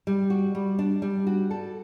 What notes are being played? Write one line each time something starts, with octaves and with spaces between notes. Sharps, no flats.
G3
F#4
G3
D4
G3
F#4
A4